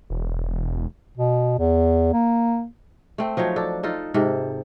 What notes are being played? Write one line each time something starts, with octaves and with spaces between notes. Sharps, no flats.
E1
B2
E2
A#3
A3 C4
F3 F#3 D#4 C#5
D4 A4
D#4 F4 A4
G#2 C3 A4